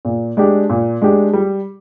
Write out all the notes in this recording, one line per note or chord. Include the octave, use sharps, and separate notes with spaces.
A#2
G#3 D4 G4
A#2
G#3 D4 G4
G3